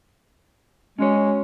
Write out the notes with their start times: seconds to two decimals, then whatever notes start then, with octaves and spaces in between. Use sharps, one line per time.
0.99 G#3 C#4 F#4 C#5